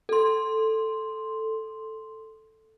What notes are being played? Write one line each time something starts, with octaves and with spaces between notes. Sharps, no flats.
A4 C6